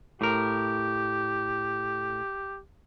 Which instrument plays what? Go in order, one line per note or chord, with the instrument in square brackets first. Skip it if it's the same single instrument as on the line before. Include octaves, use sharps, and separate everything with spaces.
[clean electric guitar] A2 A#4 [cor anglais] G4